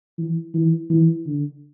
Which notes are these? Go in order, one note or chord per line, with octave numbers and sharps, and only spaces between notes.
E3
E3
E3
D3